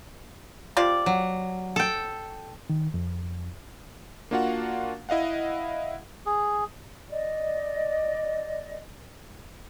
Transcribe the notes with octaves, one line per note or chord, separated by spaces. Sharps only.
C3 F4 D5
F#3
A4 G5
D#3
F2
A#3 D4 F4 F#4 F5 F#5
E4 D#5 F5 F#5
G#4
D5 D#5